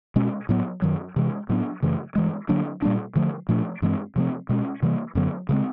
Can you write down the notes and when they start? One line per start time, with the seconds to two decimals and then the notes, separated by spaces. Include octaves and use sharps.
0.16 B2 G#3 C#4
0.49 A2 F#3 B3
0.82 F#2 D#3 F#3
1.16 C3 E3 G#3
1.49 A2 F#3 B3 D4
1.82 F#2 C#3 E3 A3
2.15 G2 E3 G#3
2.49 D3 F#3 A#3 D4
2.82 A#2 G3 A#3 D4
3.16 D3 F3 A3
3.49 A#2 F3 A3 D4
3.82 G2 E3 G#3 C4
4.16 C3 F3 A3 C4
4.49 B2 G#3 C#4
4.82 C3 E3 G3 A#3
5.15 F#2 D3 F#3 B3
5.49 C#3 E3 G#3 C4